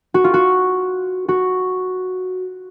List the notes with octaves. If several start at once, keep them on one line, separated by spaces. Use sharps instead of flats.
F#4
F4
F#4
F#4